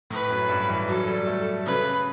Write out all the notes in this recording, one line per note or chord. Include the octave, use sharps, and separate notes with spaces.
A2 B4
F#2
G2
E3
F#3 A4
G3
A3
C#3 B4